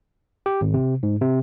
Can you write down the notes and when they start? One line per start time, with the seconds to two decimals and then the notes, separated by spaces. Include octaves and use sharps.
0.46 G4
0.61 G#1
0.74 C3
1.03 G#2
1.21 C3